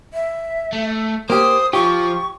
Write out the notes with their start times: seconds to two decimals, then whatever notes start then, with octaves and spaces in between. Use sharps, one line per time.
0.14 E5
0.73 A3
1.30 A#3 G4 C5 D#6
1.73 F3 F4 G4 C#6